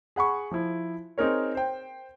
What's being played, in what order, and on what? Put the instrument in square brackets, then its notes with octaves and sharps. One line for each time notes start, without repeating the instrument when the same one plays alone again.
[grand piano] G#4 F#5 B5 C#6
F3 E4
C4 D#4 G#4 A#4 C#5
C5 G5